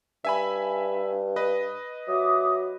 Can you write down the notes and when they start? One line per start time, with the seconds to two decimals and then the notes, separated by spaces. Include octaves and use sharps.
0.25 G2 E5 G#5 B5
1.36 B4 D#5
2.08 F#3 E5 D6 D#6